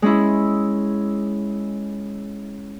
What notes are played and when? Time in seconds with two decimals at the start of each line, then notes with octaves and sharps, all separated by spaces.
0.02 G#3 C#4 E4